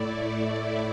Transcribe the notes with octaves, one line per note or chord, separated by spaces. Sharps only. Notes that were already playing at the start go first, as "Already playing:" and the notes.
Already playing: A2 A3 E4 D5